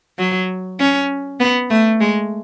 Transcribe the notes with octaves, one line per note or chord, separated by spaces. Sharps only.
F#3
C#4
B3
A3
G#3